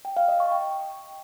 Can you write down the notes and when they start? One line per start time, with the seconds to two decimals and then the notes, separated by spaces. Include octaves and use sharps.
0.05 G5
0.17 F5
0.28 D#5
0.40 C#6
0.52 G5